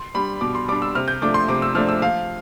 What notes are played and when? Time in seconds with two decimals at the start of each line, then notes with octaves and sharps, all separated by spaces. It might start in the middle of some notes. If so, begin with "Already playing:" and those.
Already playing: C6
0.14 G3 D4 B5
0.41 B2 D6
0.55 C6
0.68 G3 D4 D6
0.82 E6
0.95 C3 F6
1.08 G6
1.22 F3 A3 D4 D6
1.34 C6
1.48 C3 D6
1.62 E6
1.75 F3 A3 D4 F6
1.89 E6
2.02 F3 F5